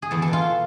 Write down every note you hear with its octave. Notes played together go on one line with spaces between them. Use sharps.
G#4
E2 A4
A4
B2
F4